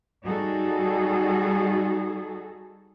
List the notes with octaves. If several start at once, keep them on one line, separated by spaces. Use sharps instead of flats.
G3 D#4 F#4 G#4 A4